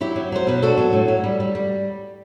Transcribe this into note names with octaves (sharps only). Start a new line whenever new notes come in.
F#3 E4 G4
F#3
F#3 C5
B2 B4
D4 F#4 A4
F#3
A2
F#3
G3
G3
G3